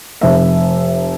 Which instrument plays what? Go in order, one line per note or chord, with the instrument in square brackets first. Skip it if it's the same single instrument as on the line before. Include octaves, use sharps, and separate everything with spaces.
[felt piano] F1 E5